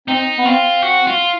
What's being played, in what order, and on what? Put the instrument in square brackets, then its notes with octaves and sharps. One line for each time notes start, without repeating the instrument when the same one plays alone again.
[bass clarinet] C4 [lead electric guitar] D#4
[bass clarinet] B3
[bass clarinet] C4 [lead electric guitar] F4
[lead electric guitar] F#4
F4